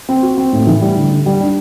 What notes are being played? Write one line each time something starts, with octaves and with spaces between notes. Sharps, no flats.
C4
F#4
C4
A2
E3
G3
D3
D3
G3
D4